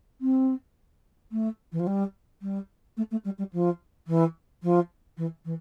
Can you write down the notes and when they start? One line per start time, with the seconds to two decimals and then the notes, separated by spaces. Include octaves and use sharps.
0.21 C4
1.31 A3
1.72 E3
1.79 F3
1.86 G3
2.42 G3
2.97 A3
3.11 A3
3.24 G3
3.38 G3
3.53 F3
4.07 E3
4.62 F3
5.17 E3
5.45 E3